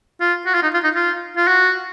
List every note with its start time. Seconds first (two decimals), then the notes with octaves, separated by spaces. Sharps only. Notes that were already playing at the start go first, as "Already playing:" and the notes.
0.20 F4
0.46 F#4
0.54 F4
0.63 D#4
0.74 F4
0.84 D#4
0.95 F4
1.37 F4
1.47 F#4